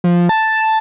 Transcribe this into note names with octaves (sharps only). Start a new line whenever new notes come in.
F3
A5